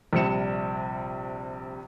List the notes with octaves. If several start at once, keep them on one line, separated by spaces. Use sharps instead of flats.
A#1 C3 G3 C4 C#7 E7